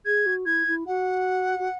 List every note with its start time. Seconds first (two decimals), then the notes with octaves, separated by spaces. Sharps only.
0.05 G#4 G#6
0.26 F#4
0.46 E4 G#6
0.67 E4
0.87 F#4 F#5
1.59 F#4